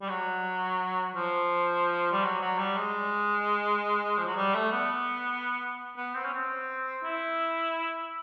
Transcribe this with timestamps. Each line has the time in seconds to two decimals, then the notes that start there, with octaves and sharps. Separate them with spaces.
0.01 G3
0.09 F#3
1.16 F3
2.12 G3
2.23 F#3
2.41 F#3
2.58 G3
2.77 G#3
4.18 F3
4.26 F#3
4.36 G3
4.54 A3
4.72 B3
5.97 B3
6.14 C4
6.25 C#4
6.33 C4
7.04 E4